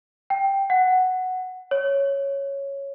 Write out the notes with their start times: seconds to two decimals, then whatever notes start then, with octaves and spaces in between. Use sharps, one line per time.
0.30 G5
0.70 F#5
1.71 C#5